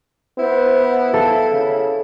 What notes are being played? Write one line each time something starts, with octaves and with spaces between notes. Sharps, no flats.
B3 E4 C5
A4 F5
C#3